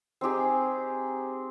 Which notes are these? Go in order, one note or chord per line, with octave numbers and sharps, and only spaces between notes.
C4 D#4 G4 G#4